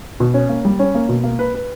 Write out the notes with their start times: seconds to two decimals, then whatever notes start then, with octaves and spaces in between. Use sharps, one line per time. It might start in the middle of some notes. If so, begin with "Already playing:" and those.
0.20 B2
0.34 C#4
0.49 A#3
0.65 G3
0.79 C#4
0.95 A#3
1.09 B2
1.24 A#3
1.39 B4
1.55 B4